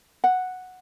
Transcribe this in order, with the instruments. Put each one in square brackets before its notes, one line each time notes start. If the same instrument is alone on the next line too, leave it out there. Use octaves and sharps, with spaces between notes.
[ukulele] F#5